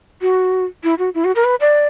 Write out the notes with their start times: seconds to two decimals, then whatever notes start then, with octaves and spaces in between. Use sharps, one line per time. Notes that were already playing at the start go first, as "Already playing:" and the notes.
0.21 F#4
0.84 E4
0.99 F#4
1.15 E4
1.25 F#4
1.35 A#4
1.44 B4
1.61 D5